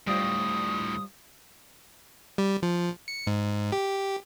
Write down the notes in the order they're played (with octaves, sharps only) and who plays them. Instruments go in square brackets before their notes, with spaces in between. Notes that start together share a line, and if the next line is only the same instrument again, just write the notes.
[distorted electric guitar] D2 A2 [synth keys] G3 F4 C5 [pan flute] D#6
[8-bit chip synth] G3
F3
C#7
G#2
G4